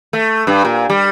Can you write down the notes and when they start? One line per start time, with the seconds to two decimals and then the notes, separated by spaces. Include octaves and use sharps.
0.13 A3
0.47 G2
0.65 A#2
0.90 G3